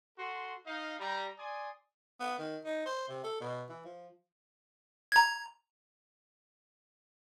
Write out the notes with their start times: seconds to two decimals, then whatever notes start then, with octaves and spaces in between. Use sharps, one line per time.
0.18 F#4 A4 C6
0.66 D#4 D#5 F5
0.99 G3 A#5
1.39 D5 G#5 C6 D#6
2.20 B3
2.38 D#3
2.65 D#4
2.86 C5
3.08 C3
3.24 A4
3.41 B2
3.69 E3
3.85 F3
5.12 A#5 G#6